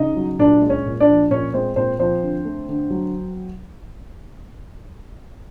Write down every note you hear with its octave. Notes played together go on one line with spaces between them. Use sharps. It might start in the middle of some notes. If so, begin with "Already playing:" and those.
Already playing: C#3 D#4 D#5
F#3
A#2 D4 D5
G#3
C#4 C#5
A#2
D4 D5
F3
A#2 C#4 C#5
G#3 C4 C5
A#2 C4 C5
F3 C4 C5
D3
A3
D3
F#3